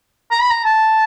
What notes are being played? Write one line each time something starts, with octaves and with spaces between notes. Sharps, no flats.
A#5
B5
A#5
A5